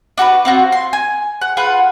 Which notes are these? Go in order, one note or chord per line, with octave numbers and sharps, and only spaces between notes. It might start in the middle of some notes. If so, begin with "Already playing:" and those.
D4 F#4 A4 B4
C4 F4 F#4
C6
G#5
F#5
F4 G#4 B4 F#5